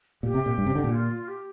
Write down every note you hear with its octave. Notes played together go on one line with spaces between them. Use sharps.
A#2 G4
C3
A#2
G2
C3
D3
A#2
F4
G4